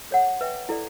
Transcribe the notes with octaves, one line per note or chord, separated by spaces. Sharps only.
A4 C#5 F#5
B4 E5 G5
E4 A4 D5